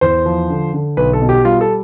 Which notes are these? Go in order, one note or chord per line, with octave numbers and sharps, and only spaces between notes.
E2 C5
F3
D3
D3
B1 B4
A4
B2
G4
G3 F4
A4